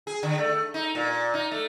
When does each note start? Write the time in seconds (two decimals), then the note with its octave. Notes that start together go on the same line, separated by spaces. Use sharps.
0.07 G#4
0.23 D3
0.39 A3
0.74 D#4
0.95 A#2
1.34 D#4
1.51 A3